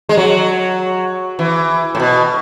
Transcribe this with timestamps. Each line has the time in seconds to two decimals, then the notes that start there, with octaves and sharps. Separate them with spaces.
0.09 G#3
0.17 F#3
1.39 E3
1.95 A2
2.00 B2